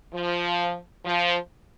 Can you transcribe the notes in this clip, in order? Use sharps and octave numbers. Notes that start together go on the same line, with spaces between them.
F3
F3